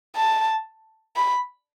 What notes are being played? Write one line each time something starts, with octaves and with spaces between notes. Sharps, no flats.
A5
B5